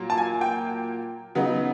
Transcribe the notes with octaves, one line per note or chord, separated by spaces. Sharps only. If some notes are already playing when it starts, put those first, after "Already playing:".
Already playing: A#2 F#3 A#3
A5
G#5
G5
C#3 F#3 B3 D#4